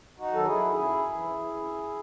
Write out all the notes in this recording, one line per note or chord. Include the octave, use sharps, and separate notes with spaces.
D#4 F#4
D#3 F#3 A4
E4 G#4
F#2 E4 G#4
E3
F#2